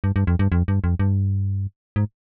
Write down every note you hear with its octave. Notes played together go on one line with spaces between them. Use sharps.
G2
G2
F2
G2
F2
G2
F2
G2
G#2